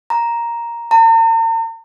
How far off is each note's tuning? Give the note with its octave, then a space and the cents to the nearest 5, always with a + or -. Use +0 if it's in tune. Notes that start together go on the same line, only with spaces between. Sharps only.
A#5 +5
A#5 -45